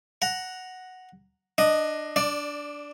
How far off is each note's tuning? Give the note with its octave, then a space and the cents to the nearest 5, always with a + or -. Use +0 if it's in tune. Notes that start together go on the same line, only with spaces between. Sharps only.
F#5 +0 A#5 +0
D4 +20 D#5 +0
D4 -10 D5 +15